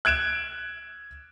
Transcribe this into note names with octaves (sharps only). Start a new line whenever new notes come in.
F#6 G#6 D7 E7